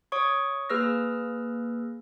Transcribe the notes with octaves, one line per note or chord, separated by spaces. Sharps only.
C#5 C#6 D#6
A#3 G#4 B4 E6 F6 A#6